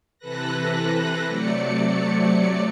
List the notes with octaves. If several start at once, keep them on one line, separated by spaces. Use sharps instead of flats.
C3 E3 A4 B4 F#6 A#6
C3 F#3 A3 D5 C#7